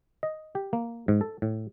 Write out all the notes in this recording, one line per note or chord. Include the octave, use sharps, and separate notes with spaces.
D#5
G4
A#3
G#2
A4
A2